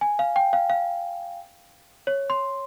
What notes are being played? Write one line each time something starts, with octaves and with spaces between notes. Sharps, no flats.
G#5
F5
G5
F5
F5
C#5
C6